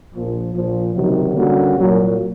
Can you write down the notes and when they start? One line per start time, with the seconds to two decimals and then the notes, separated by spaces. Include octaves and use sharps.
0.14 A#1 A#2 F3
0.54 A#1 A#2 F3
0.95 C#2 C3 D#3 F#3
1.35 D3 G3 A#3 C#4 F#4
1.75 C2 A#2 F#3 A#3